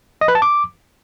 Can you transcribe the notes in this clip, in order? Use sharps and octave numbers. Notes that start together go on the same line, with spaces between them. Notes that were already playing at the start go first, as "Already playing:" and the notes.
D#5
B4
A5
D6